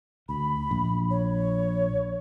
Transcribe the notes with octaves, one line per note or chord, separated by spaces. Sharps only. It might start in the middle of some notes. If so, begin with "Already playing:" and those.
D2 B5
A#1
C#5